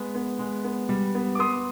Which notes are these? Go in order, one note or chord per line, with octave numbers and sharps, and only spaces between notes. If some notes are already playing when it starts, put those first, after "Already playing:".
Already playing: G#3 B3
B3
G#3
B3
G3
B3
D6
B3 C6 D#6